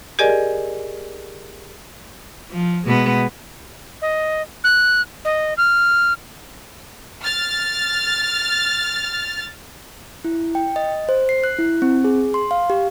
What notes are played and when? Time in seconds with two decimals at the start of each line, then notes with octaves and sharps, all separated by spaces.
0.19 G4 G#4 A#4 D5 D#5 G#5
2.51 F3
2.86 B2 G#3 B3
4.02 D#5
4.64 F#6
5.25 D#5
5.58 F6
7.22 F6 A6
10.25 E4
10.55 G5
10.76 D#5
11.09 C5
11.29 C7
11.44 F#6
11.59 E4
11.82 C4
12.04 G#4
12.34 C6
12.51 F5
12.70 G4